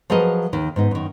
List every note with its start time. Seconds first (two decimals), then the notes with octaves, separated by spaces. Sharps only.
0.10 F3 F#3 G#4 A#4 B4 D#5
0.53 D#2 D#3
0.76 G#2 B3 D#4
0.91 F#2 D#3